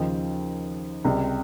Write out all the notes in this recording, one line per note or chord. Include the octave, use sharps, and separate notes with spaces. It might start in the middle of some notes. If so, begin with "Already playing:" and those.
Already playing: D#2 C#3 F3 D#5 G5
C#2 C3 G3